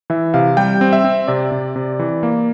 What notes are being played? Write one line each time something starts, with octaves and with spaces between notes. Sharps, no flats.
E3 E5
C3 F5
G3 G5
C4
E5
C4
C3 D5
C3
C3
E3
A#3